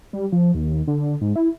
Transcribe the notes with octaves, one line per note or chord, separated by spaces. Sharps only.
G3
F3
D#2
D3
G#2
E4